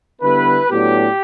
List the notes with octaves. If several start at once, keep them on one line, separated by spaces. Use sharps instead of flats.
D3 G3 B3 E4 B4
A2 F#3 B3 D4 G4